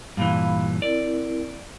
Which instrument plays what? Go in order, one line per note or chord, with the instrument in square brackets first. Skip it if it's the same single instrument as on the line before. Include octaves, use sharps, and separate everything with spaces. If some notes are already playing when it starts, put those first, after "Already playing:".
[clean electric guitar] G2 A#2 E3 [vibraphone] F5 B5
[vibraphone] C4 E4 A#4 [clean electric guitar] D5